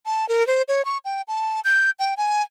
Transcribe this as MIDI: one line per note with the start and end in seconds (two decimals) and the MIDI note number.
0.06 0.28 81
0.29 0.46 70
0.47 0.62 72
0.68 0.85 73
0.85 0.98 85
1.05 1.22 79
1.28 1.61 81
1.65 1.91 91
1.99 2.14 79
2.17 2.42 80